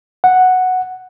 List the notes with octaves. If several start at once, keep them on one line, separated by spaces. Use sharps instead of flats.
F#5